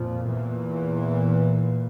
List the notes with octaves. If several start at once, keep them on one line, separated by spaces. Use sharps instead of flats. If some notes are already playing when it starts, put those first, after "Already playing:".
Already playing: F2 A#2 F3
E2 E3